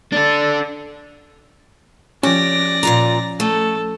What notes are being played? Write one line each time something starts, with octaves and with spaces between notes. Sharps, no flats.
D4 A4
F3 C#4 G4 D5 A#6
A#2 F4 A#5
A3 A4